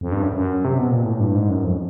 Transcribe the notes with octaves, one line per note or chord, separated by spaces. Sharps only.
F2
G2
F#2
F#2
C3
B2
A#2
A2
G2
G#2
F#2
F2